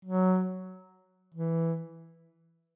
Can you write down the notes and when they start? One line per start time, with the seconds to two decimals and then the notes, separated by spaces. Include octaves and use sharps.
0.05 F#3
1.34 E3